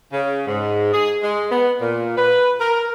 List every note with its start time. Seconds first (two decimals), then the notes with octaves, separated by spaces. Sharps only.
0.12 C#3
0.47 G#2
0.92 G#4
1.22 G#3
1.51 B3
1.81 A#2
2.17 B4
2.59 A#4